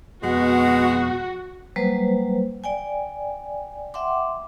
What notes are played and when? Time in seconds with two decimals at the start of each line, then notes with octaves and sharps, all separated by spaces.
0.23 F2 B2 G#3 F#4 F#5
1.76 F#3 G3 A#3 B4 C5
2.64 D5 G5 G#5
3.94 E5 F#5 G5 C6 D6